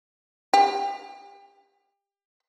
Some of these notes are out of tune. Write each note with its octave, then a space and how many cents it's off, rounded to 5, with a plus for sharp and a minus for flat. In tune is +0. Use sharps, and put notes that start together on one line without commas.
G4 +30